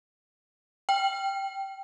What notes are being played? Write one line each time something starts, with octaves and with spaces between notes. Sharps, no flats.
G5